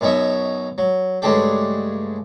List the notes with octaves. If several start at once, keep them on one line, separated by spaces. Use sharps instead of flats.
F#2 B2 C#4 D#4 E5
F#3
G2 C#3 G#3 A3 D4 G4